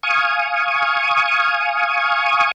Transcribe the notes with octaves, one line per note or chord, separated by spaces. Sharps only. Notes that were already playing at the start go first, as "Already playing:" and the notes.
F5 G#5 C#6 D#6